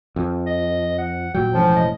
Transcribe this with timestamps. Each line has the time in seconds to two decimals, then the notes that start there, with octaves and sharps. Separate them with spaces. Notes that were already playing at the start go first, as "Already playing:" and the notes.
0.16 F2
0.47 D#5
0.98 F#5
1.34 D#1 A#2 F#3 G5
1.53 E1 A2 F3 C#4
1.76 D#5